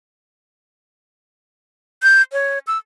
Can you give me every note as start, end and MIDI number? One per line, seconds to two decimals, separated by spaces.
2.03 2.22 91
2.33 2.59 73
2.67 2.78 88